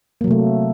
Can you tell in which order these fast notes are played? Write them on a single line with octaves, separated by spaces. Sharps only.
A#3 F#3 C3 A3